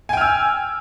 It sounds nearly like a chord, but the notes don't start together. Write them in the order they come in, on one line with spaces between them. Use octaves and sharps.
G#5 G5 F6 E6